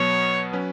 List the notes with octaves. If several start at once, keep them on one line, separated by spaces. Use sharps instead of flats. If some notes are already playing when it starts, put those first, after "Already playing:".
Already playing: B2 F#3 B3 C#5
F#3 C#4 B4